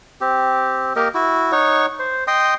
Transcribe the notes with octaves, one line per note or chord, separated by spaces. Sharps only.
C4 G4
A#3 G4 A#4 D#5
E4 F#4
D#4 C#5 F#5 C#6
C5
D#5 G5 C6 D#6